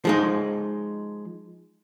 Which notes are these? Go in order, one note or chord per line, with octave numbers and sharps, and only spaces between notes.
F3 G#3 D#4